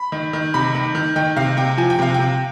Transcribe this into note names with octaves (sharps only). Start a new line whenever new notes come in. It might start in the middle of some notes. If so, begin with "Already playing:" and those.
Already playing: B5
D#3
D#3
C3 B5
D#3
D#3
D#3 G5
C3 F5
C3 G5
F3 G#5
G5
C3 F5
C3 G5